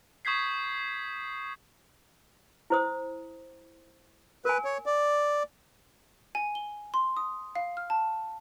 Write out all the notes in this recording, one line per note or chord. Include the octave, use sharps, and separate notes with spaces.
C#6 D#6 G6 G#6 B6 C7
E4 C5 D#6
A#4 B4 G#5
C#5
D5
G#5
G7
C6
D#6
F5
F6
A5